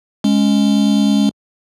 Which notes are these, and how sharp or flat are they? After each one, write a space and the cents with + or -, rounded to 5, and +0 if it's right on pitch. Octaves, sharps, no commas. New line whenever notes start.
G#3 +0 C#4 +0